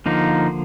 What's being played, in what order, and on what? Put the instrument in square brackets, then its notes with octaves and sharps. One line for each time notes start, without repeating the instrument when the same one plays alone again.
[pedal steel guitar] D3 F3 A#3 D#4